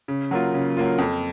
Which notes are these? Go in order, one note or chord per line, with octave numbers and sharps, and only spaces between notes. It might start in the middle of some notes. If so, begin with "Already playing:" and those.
C#3
F#3 A#3 F4
C#3
F#3 A#3 F4
F2